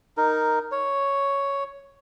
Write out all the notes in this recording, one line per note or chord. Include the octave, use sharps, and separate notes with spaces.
D#4 A#4
C#5